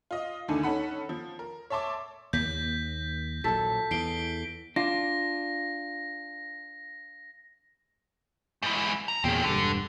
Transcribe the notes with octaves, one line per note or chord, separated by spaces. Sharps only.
F4 D#5
D2 D3 D#3 D4 A4 G#5
C#4 D#4 A4 F#5 B5
F3
A#4
C#5 E5 A5 C6 D6
D#2 A#3 G6 A#6 B6
A#1 A#2 F#3 A4 B6
E2 E3 C7 D7 G7
D4 F4 A#6
G#2 E3
A#5
E2 A#2 C#3 C4 G#4
E1 G2 D3